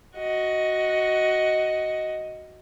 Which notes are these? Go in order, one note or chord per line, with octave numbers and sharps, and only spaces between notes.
F#4 D#5